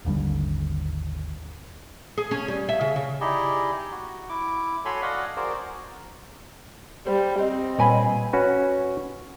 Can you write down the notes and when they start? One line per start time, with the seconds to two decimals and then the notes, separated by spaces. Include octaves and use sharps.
0.05 G#1 D#2 D3 G3
2.18 G#4
2.31 C#4
2.48 G3
2.69 E5
2.81 C#3
2.96 C#3
3.21 D#4 E4 G4 G#4 D5 D#5
3.92 F#4
4.29 E4 D6
4.85 F#4 A4 C#5 G#5 B5 C6
5.02 F#4 D5 D#5 F5 F#5
5.36 F#4 G#4 A#4 C5 D5
7.07 G3 C5
7.39 C4 D#5
7.78 A#2 G3 B4 C#5 G#5 B5
8.33 C#4 F#4 B4